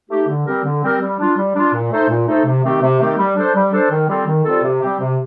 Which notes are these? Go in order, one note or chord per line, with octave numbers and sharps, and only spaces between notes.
A3 D#4 G4
D3
G3 C4 G4 A#4
D3
G3 C4 G4 A#4
G3
D4 F4
G3
D4 F4
A#2
A3 D#4 A4 C5
A#2
A3 D#4 A4 C5
C3
D#3 A3 C4 G4
C3
D#3 A3 C4 G4
G3
D4 A4 C5
G3
D4 A4 C5
D#3
G3 C4 F4 A4
D#3
G3 C4 F4 A4
C3
G3 C4 G4
C3